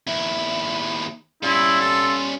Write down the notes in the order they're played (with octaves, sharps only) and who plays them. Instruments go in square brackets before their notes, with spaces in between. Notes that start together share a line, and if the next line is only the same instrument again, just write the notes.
[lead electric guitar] D#2 E4
[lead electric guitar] G3 C#4 [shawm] E4 [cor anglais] F4
[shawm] A4